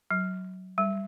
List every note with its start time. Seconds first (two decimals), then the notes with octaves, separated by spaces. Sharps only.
0.11 F#3
0.78 G3